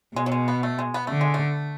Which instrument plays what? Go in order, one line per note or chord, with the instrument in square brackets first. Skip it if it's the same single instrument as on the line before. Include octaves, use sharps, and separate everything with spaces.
[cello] B2 [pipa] G#3
[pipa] F#3
G#3
B3
A3
G#3
B3
[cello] D3 [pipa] A3
[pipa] G#3
A3